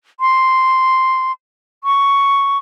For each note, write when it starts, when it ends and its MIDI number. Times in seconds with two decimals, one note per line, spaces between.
0.20 1.32 84
1.84 2.58 85